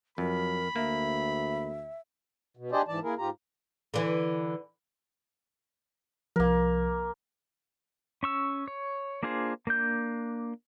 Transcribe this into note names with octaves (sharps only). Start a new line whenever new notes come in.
F2 F#3 A#4 B5
D2 A#3 E5
B2
D4 G4 G#4 C5 D5 D#5
G#2 E3 D5 A5
A#3 E4 G#4 A#4
G#2 F4 G4 A#5
D3 E3
C2 F3 A#3 A#4
C#4 C#6 E6
C#5
A#3 D4 F4 G#4 C5
A#3 D4 G6